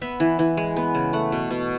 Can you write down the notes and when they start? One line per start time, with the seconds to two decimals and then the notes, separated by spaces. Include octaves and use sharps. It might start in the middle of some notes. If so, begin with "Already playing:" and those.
0.02 B3 E5
0.20 E3
0.39 E3
0.57 G#3
0.76 B3
0.95 C#3
1.13 A3 F#5
1.32 B2
1.51 B2